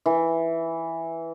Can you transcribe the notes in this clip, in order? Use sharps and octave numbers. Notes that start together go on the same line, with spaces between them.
E3